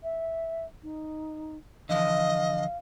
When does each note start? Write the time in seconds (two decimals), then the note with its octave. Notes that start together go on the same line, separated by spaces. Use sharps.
0.03 E5
0.83 D#4
1.89 D3 E3 F3 D#5 F5